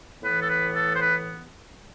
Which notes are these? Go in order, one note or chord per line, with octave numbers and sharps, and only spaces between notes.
A2 E3 B3 B4
A4
B4
A4
C5
B4